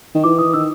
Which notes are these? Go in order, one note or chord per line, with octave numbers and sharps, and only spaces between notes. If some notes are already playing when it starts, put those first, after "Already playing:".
D#3
E3 D6
D#6
D#3 E6